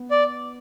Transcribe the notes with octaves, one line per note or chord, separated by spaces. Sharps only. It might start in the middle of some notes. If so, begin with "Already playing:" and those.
Already playing: B3
D5